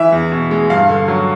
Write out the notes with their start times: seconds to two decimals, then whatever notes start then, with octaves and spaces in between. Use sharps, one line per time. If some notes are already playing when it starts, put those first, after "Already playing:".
Already playing: E3 E5
0.12 E2
0.32 B2
0.51 G#3
0.70 G2 F5
0.89 D3
1.08 F#3